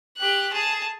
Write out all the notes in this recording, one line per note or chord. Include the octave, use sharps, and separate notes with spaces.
G4 F#6
G#4 A5